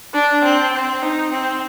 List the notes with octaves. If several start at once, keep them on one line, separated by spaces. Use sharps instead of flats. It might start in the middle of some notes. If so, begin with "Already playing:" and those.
D4
C4
C4
D#4
C4